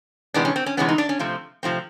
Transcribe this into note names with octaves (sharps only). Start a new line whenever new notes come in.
C3 E3 G#3 B3 D4
C#4
C4
C#4
C3 E3 G#3 B3 C#4
D#4
D4
C#4
C3 F3 A3 C4
C3 F3 A3 C4